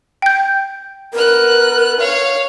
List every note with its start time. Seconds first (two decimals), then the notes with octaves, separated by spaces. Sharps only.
0.22 G5 G6
1.13 B3 A#4 F#6
1.99 C#5 F5